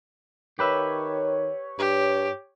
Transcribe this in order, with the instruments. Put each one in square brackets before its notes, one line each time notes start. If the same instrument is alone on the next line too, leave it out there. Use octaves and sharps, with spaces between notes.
[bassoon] D#3 [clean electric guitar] G4 B4 E5 [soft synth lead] C#5
[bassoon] G2 [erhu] G4